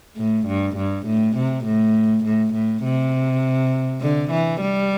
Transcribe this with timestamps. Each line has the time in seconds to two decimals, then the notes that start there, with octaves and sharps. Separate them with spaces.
0.17 A2
0.46 G2
0.77 G2
1.06 A2
1.36 C3
1.65 A2
2.24 A2
2.53 A2
2.84 C3
4.01 D3
4.31 E3
4.61 G3